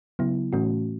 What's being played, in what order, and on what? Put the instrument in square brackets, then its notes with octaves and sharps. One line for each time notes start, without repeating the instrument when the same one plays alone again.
[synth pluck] C#3 F#3 B3 E4
A2 E3 A3 C#4 F#4